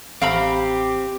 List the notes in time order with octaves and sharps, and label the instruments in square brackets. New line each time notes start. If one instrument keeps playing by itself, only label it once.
[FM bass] A1 [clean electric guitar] C4 [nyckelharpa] G4 [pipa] F5 A#5 B5